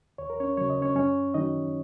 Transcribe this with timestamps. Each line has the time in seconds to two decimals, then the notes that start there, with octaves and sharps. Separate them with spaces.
0.18 D#2 C#5
0.30 A#4
0.40 C#4 C#5
0.57 C#3 F#3 C#5
0.70 D#5
0.81 C#4 C#5
0.96 F#2 C#4 C#5
1.34 D#3 F#3 D#4 D#5